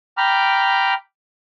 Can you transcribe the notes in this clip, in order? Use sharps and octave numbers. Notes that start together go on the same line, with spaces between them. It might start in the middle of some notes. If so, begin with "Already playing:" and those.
G5 A#5 B5 D6 F6